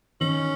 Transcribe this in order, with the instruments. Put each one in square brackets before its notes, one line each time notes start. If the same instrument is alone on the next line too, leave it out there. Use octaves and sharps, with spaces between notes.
[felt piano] D#3 [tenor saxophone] C#4